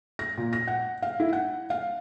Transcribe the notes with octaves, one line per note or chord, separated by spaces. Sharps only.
A#6
A#2
A#6
F#5
F5
E4
F#5
F5